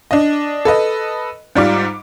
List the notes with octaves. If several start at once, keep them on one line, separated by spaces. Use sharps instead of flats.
D4 D#5
A4 B4 D#5
G#2 G3 F4 D6